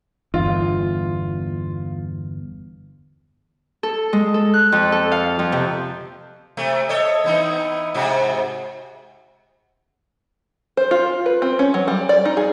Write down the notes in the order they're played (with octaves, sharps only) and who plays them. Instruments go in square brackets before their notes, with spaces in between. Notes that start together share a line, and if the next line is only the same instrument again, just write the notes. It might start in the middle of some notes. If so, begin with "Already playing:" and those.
[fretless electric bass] G1 E2 [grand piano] F4
[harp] A4
G#3
A4
F#6
F2
A4
F5
F2
C3
[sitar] C3 A3
A4 C#5 D#5
E3 B3 D#4
G#2 C3 F#4
[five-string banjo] C5
F4
B4
C4
C#4
F#3
G3
D5
D#4
G#4